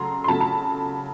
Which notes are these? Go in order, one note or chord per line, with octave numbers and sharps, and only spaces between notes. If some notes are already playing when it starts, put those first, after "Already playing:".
Already playing: C#3 F#3 A3 A#5 C6
C6
C#3 F#3 A3 A5 B5
A5 B5